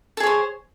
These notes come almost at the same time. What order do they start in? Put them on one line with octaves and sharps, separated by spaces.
A4 G#4 C#5 C5